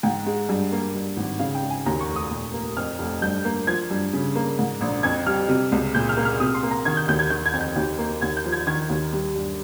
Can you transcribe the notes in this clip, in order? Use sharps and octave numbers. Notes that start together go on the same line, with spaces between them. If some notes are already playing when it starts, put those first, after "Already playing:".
G#2 G5
G#3
G2
A#3
G2
G#1
C#3 F5
G5
G#3
G#5
D#2 A#5
C#6
F1
D#6
A#2
A#3
F2 F6
F1
G2 G6
A#3
F3 G#6
G2
C#3
A#3
G#2
A#1
F2 G#6
G3 F6
C3
C#2
A#2 G6
F6
A#3
F6
C3 D#6
C6
A#3
A#5
D#3 G#6
G6
D#2 G6
G#6
D#3 G6
G#6
F2
G6
D#2
A#3
D#2 G#6
G6
F3
G#6
D#3 G#6
D#2
G3
G2